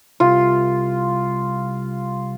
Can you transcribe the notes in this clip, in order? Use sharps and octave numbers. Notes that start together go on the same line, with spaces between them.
C2 F4